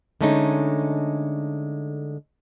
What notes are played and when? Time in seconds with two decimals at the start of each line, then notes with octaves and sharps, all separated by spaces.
0.21 D3 G#3 A3 C#4 D#4